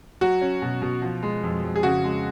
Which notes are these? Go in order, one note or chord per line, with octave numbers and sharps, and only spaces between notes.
F#3 F#4
C#4
B2
B2
F3
G#3
F2
F2
G#4
C#3 F#4
G#3